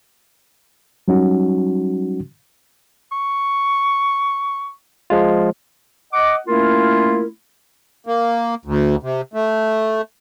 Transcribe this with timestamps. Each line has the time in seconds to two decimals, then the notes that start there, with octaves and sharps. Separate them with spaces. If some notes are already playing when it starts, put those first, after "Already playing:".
1.08 F#3 G3 C#4 D#4 F#4
3.12 C#6
5.10 F3 G#3 F4
6.13 D#5 F#5 D6
6.48 A3 A#3 C#4 E4 F4 A#4
8.06 A#3
8.65 D2
9.03 C3
9.33 A3